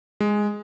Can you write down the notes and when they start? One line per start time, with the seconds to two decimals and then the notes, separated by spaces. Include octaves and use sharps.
0.20 G#3